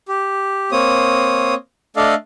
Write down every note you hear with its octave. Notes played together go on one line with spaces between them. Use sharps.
G4
A#3 C4 C#5 D#6
A3 D4 A4 D5 D#5 F5